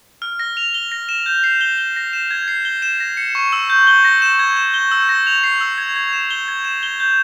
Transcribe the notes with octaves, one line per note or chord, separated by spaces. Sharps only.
F6
A#6
F7
G7
A#6
E7
G6
C7
G7
G7
A#6
E7
G#6
C7
G7
E7
A#6
C#7
C#6
E6
G6
G7
A#6
E7
G#6
E7
G7
E6
A#6
F7
C7
E6
G#6
G#6
E7
G7
G#6
E7
G7
G6